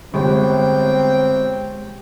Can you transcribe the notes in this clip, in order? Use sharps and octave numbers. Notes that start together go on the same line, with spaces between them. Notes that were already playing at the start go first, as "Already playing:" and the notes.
G1 G#3 C4 G4 G5